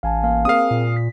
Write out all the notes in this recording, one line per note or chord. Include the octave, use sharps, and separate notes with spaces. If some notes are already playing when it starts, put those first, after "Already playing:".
A1 F5 G#5 A5
A#3 F5
C4 G#4 A#4 F5 D#6
A#2
B6